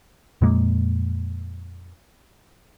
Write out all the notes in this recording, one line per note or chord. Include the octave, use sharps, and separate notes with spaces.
F2 A#2 G#3 A#3